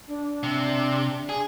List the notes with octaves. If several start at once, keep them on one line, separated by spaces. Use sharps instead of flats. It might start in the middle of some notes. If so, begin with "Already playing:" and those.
D4
C3
G#4